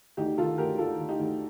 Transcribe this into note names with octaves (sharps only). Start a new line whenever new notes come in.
D2 D#4 G4
D#3 F4 A4
D2 G4 A#4
D2 F4 A4
D2
D#4 G4
D2